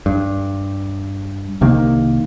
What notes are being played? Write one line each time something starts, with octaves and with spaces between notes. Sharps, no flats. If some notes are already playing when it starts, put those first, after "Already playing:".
G2
C2 C3 D#3 A#3